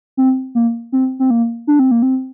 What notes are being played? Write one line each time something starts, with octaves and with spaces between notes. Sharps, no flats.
C4
A#3
C4
C4
A#3
D4
C4
A#3
C4